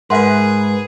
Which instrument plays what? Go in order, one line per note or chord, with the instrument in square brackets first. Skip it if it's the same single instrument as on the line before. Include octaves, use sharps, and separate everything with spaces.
[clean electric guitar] G#2 [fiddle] G#4 [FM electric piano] A#4 B4 [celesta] E5 F#5 C6